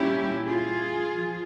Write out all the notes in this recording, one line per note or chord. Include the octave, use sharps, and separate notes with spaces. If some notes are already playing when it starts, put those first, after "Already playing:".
Already playing: A#2 G3 C#4 E4 G4
F4 G#4
F3